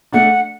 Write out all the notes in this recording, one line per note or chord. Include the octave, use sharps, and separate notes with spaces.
A3 D4 F#5